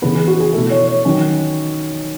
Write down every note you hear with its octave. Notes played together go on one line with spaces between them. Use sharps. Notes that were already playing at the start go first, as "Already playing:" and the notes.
C#3 E3 B3 B4
G#4
F#4
G#4
B2 A3 E4 A4
C#5
C#5
D#3 F#3 C#4